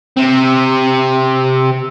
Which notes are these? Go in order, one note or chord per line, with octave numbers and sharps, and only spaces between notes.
C3 C4